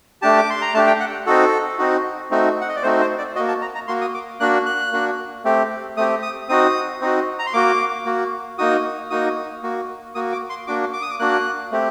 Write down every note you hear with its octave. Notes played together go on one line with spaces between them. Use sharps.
A3 D4 G4 A5
D6
C6
A#5
A3 D4 G4 A5
G5
F#5
C4 D#4 F#4 A4
C4 D#4 F#4
A3 C4 D#4 F#4
F#5
D#5
D5
A3 C4 D#4 F#4 C5
C5
D5
A#3 F#4 D#5
A5
A#5
A#5
A#3 F#4 C6
D#6
D6
A#3 D4 F#4 F#6
F#6
A#3 D4 F#4
A3 C4 G4
A3 C4 G4 D#6
D#6
C4 D#4 F#4 D#6
C4 D#4 F#4
A#5
C6
A#3 F#4 D6
A#3 F#4
A#3 D#4 F#4 D#6
A#3 D#4 F#4 D#6
A#3 F#4
A#3 F#4 D#6
D6
C6
A#3 D4 F#4 D6
D6
D#6
D6
A#3 D4 F#4 F#6
A3 C4 G4